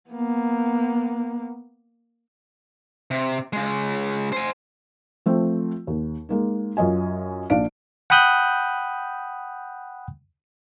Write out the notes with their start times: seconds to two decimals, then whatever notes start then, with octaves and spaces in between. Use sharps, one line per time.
0.10 A#3 B3
3.11 C3
3.53 C#3 G#3
4.33 C5 G#5
5.26 F3 A3 C4
5.87 D#2
6.29 G#3 A#3 D#4
6.77 F#2 F4 D#5 G#5
7.50 A#1 D4 F5 D7
8.10 F#5 G5 B5 D#6 F#6 G6